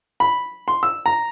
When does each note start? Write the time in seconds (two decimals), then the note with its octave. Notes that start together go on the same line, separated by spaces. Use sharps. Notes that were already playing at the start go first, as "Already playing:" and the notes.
0.20 B5
0.68 C6
0.83 E6
1.06 A#5